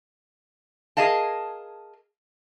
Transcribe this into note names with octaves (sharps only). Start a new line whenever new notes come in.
G#4 A#4 D#5 F5 A5